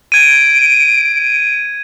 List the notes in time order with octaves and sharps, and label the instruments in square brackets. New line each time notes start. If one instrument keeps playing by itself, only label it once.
[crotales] G#6 D#7 [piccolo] D7